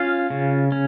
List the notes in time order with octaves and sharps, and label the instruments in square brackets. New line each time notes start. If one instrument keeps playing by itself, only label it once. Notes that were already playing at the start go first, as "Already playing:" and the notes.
Already playing: [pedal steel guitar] C#4 F4 F5
C#3
C#4